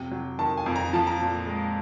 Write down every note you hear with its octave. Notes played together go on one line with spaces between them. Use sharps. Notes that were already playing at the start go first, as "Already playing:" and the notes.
Already playing: F2 C3 F#3 G5
F#3
D#3 A5
G#5
F2
A#5
F3 A5
A#5
A#2 A5
G#3